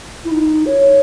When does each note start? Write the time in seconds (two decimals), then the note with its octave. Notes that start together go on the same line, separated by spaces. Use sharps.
0.24 E4
0.31 D#4
0.65 C#5